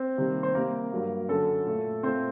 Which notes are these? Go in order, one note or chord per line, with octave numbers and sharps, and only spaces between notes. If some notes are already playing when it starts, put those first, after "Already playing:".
Already playing: C4 C5
C3 D#3 G3 A#3
C5
C3 G3 A#3 A#4
G2 F#3 A#3
F#2 D3 F#3 A4
A#2 A3
A#2 A3 C4 C5